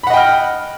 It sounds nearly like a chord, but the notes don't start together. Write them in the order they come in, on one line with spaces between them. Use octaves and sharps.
B5 F#5 D#5 G5 F6